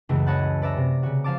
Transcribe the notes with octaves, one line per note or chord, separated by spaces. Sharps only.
C#2 F#2 C#3 E3 A3
C#5 D#5 F#5 A5 B5 F#6
B4 D5 E5 A#5
C3
C#3 F#4
F3 F5 A5 D6